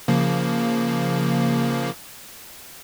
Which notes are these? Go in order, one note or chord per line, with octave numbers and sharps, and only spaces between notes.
C#3 F3 A#3